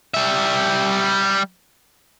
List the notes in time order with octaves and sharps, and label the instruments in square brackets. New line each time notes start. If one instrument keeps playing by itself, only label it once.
[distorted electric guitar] G3 E5